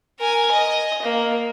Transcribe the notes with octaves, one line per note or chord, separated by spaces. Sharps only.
A#4 G#5
D#5
A#3